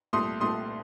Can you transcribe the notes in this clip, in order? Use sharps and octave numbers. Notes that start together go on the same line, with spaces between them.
C2 A#2 A3 C6 D#6
C2 A#2 A3 C6 D#6